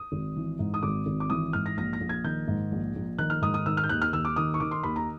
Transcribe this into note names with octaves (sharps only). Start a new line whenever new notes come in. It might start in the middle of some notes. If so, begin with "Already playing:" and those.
Already playing: D#6
G#1
E3
G#2
D#6
G#1 D6
G#1
D6
E3 D#6
G#2 F6
A#6
A#1 A#6
A#6
A#1
G#6
D#3 G6
G#2
A#1
A#1
D#3 F#6
F6
G#2 D#6
D#6
D#3 E6
F6
G6
D#2 F#6
F6
D#2 E6
D6
D#3 D#6
C#6
D#3 D6
C6
D#2 B5
A#5